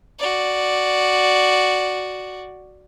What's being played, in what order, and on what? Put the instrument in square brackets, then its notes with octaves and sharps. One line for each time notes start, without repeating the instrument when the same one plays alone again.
[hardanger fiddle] F#4 D5